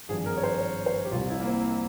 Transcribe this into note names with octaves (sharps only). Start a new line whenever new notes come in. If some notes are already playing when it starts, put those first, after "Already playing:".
G#1 G2 F3 G#4
A#4
C#5
C5
C#5
C5
G4
C2 C3 G3 F4
E4
A#3
C4